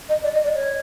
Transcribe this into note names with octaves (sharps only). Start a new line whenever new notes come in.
D#5
D5
D#5
D5
C#5